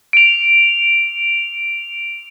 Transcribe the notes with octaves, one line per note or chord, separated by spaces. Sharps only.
D7 F7